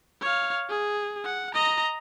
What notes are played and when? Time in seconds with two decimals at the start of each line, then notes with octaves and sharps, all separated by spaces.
0.22 C#5 F5
0.69 G#4
1.25 F#5
1.54 D#5 A#5